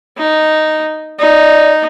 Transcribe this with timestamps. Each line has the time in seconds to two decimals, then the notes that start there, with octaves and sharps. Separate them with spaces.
0.17 D#4
1.19 D#4 D5